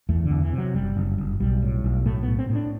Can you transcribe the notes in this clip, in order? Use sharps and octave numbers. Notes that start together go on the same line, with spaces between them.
E2 A3
D3
E2
E3
C3 F#3
F#1 G3
F#1
F#1
B1 G3
A2
B1
A2 A3
B3
A2
C4
A2 C4
D4